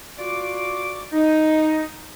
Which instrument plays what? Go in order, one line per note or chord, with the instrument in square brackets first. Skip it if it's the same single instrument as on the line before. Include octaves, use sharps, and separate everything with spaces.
[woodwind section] F4 F#4 D5 D6
D#4